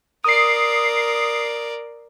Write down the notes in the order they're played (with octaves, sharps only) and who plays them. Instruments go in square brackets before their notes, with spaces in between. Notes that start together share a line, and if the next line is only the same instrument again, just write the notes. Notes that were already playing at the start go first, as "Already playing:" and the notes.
[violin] A#4 D5 [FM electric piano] D#6 C7